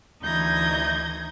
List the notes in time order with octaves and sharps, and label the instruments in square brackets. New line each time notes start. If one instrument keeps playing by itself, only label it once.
[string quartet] D2 E3 D#4 G6 G#6 A#6